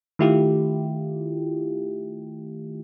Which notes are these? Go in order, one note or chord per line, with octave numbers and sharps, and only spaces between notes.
D#3 A3 E4 F4 G4